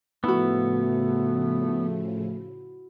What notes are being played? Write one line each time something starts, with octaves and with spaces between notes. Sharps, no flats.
A2 C#3 F3 A3 B3 E4 F#4